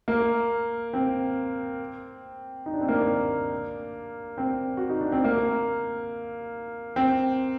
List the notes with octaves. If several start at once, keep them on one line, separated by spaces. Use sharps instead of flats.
A#3
C4
D#4
D4
C4
A#3 D4
C4
F#4
D#4
D4
C4
A#3
C4